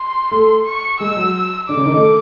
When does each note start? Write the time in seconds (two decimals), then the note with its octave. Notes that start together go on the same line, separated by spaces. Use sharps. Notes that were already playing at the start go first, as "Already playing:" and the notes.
Already playing: C6
0.31 A3 A4
0.66 C#6
1.00 G#3 G#4 E6
1.17 F#3 F#4
1.68 D3 D4 D6
1.76 C#3 C#4
1.85 D#3 D#4
1.94 A3 A4